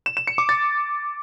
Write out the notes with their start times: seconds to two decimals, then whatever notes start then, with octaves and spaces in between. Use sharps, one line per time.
0.06 E7
0.17 E7
0.27 C#7
0.38 D6
0.49 A6